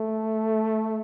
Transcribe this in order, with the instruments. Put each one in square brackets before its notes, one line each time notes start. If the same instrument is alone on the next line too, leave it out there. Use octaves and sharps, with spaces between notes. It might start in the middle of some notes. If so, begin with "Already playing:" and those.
Already playing: [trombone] A3